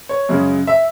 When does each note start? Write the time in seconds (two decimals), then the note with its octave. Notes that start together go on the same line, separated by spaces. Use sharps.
0.09 C#5
0.29 F#2 C#3 G#3
0.67 E5